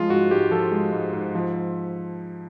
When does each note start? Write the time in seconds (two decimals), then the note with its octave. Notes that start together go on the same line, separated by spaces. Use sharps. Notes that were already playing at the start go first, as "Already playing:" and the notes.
Already playing: F3 G#3 F4
0.10 G#2 F#4
0.31 G#2 G4
0.51 F3 A4
0.72 G#3
0.92 G#2
1.13 G#2
1.35 F3